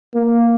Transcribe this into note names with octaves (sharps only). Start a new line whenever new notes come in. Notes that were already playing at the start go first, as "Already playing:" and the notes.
A#3